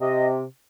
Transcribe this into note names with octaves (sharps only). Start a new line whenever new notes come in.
C3 D#5